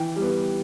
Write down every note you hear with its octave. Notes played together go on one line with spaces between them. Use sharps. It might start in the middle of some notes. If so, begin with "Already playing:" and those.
Already playing: E3 G5
G3
B3